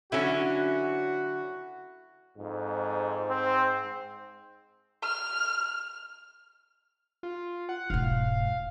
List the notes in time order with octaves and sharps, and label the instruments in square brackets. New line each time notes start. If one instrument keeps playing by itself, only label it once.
[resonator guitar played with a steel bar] D3 F#3 C#4 [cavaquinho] E4 [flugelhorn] F#4
[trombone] F2 [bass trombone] G#2
[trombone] C4
[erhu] F6
[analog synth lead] F4
F#5
[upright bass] E1 G#2 [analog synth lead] F5